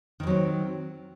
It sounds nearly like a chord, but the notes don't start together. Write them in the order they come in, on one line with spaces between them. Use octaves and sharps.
D#3 E3 F#3 C4